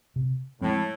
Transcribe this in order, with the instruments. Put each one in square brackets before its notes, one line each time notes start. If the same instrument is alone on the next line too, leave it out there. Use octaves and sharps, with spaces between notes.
[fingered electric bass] C3
[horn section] A2 [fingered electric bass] F3 G#3 C4